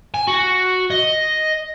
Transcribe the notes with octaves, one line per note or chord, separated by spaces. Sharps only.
G#5
F#4
D#5